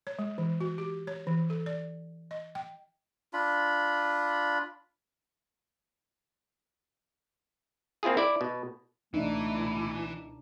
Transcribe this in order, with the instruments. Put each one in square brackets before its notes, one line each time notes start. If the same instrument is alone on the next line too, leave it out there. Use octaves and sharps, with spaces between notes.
[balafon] C#5
G#3
E3
F#4
G4
C#5
E3
A4
D5
D#5
G5
[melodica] D4 F4 B5
[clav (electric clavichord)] A#3 C4 E4 F4 G#4
E4 D5
B2
[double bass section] C#2 B2 [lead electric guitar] E3 [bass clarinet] A3 [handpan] D4 D#4